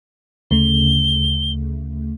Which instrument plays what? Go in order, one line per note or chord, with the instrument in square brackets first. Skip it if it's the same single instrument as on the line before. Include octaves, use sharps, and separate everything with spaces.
[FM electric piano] D2 C#3 A3 [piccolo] G7